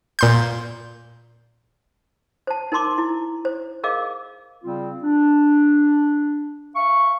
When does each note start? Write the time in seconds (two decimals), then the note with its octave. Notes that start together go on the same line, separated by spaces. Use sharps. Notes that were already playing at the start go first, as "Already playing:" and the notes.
0.19 A#2 C6 G6
2.47 C5 A5
2.72 D#4 A#4 A5 C6 D6
2.98 E4
3.45 C5
3.84 G#4 A#4 D#5 F5 D6
4.64 C#3 G3 C4 F4
5.04 D4
6.76 E5 F5 C#6